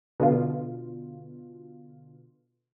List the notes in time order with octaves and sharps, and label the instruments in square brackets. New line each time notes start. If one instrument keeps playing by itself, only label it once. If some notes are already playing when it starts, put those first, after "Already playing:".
[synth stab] B2 D3 F4